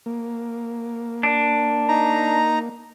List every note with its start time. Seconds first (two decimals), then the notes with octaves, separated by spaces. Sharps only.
0.06 A#3
1.23 D4
1.89 D#4 A#5